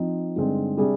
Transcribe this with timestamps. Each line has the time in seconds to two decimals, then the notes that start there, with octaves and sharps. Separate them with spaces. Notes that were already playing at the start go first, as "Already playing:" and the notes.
Already playing: F3 C4 D#4
0.36 G2 D3 G#3 C4 D#4
0.77 C3 G3 D4 G#4